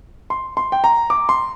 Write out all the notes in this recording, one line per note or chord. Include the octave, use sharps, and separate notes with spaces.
C6
C6
G5
A#5
D6
C6